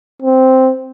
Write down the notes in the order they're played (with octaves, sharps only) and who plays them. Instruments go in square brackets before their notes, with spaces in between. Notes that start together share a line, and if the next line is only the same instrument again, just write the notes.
[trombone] C4